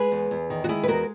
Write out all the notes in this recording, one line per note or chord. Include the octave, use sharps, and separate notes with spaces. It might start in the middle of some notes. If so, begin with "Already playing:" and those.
Already playing: G#3 G#4 B4
E2
E2
D#3
F#4
G#3 E4 G#4
B4
E2 F#4 A#4